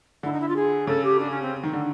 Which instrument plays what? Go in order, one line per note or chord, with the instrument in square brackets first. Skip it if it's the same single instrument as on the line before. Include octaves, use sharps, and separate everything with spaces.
[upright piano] D3 [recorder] E4
[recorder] D#4
E4
F4
G#4
[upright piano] C#3 [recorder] A4
[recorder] G4
D4
C#4
C4
[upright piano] D#3
D3